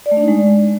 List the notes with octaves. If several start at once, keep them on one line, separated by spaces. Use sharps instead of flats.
D5
A3
D4
D#4
G#3